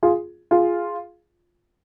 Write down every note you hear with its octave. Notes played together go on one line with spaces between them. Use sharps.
F4 G#4
F4 G#4